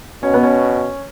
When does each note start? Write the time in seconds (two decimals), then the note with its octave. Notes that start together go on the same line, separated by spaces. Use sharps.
0.23 B2 C#4
0.34 B3
0.43 C#4